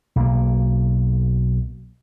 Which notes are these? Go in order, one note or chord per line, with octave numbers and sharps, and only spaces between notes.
B1 A#3